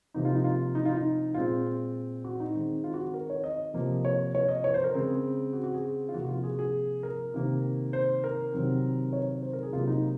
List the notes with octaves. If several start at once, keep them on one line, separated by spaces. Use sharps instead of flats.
C3 F3 A#3 D#4
F4
D#4
F4
D#4
F4
D#4
A#2 G#3 C4 F4
F#4
D#4
D#3 G#3 C4
F4
F#4
F#4
A#4
C#5
D#5
C3 F3 A#3
C#5
C#5
D#5
C#5
C5
A#4
C#3 G#3 C4 A#4
G#4
F#4
F#4
G#4
F4
C3 F3 A#3 F#4
F#4
F4
G#4
F#4
G#4
A#4
C3 D#3 A#3
C5
A#4
C3 D#3 F#3 C4
C#5
C5
A#4
G#4
C3 F#3 A#3 F4
D#4